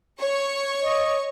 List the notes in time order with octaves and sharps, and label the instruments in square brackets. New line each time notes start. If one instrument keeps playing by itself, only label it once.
[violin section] C#5 C#6
[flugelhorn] D#5